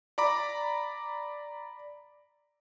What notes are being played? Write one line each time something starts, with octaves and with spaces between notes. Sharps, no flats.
D5 A#5 B5 D6